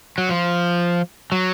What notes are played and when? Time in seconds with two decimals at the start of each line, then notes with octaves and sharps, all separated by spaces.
0.18 F#3
0.29 F3
1.32 F#3